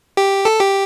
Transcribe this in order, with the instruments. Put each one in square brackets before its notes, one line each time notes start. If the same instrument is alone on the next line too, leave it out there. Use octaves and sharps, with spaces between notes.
[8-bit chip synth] G4
A4
G4